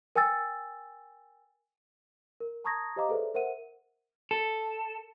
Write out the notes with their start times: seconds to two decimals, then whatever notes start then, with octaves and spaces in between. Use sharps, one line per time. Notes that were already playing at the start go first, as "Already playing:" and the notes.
0.15 A#4 G5 G#5 E6 A6
2.40 A#4
2.64 A5 A#5 C#6 D#6 G#6 A#6
2.96 G4 C5 D#5 F5 A#5 D6
3.09 G#4 A4 B4 C5 D5 E5
3.34 A#4 C5 E5 F#5 D#7
4.31 A4